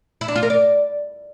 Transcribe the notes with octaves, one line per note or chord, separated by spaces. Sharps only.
E4
D4
F4
A#4
D5